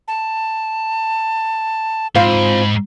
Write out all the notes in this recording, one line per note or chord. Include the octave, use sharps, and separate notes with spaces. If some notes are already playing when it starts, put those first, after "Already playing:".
A5
G#2 C4 F4 B5